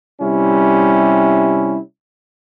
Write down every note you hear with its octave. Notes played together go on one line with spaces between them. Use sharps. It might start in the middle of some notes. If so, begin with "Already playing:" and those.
C3 G3 C#4 E4